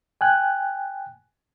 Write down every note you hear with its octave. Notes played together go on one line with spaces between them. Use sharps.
G5 G#5 F#6